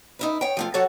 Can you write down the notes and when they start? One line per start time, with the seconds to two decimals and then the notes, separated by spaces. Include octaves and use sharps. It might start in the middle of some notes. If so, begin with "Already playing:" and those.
0.19 D#4 E4 B4
0.41 C#5 G5
0.57 F3 A3 F4
0.74 F#3 F#4 A4 C#5 F#5